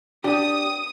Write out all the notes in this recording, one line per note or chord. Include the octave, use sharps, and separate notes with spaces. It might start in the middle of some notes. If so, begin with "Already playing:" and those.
D4 G4 D#6